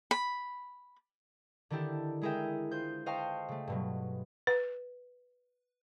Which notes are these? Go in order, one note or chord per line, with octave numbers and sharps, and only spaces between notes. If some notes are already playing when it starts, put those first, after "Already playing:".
B5
D3 D#3 D4 E4 G4 A4
G#3 E4 G#4 A#4 E5 G5
F4 C5 G6
C5 D#5 F5 G5 A5 C#6
C#3 A3
G2 B2 F#3
B4